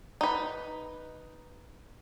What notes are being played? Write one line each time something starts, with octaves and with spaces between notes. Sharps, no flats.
D#4 B4